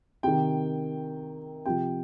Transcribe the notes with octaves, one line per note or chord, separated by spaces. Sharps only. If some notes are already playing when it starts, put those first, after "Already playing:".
C3 D#3 G5
C3 F3 G5